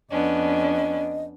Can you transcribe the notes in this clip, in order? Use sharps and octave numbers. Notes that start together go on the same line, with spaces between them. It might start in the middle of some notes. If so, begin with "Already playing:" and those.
F2 B3 C#4 D4 D#5